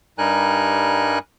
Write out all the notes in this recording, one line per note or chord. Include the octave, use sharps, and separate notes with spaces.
G2 G3 D#4 A#4 G#5 F#6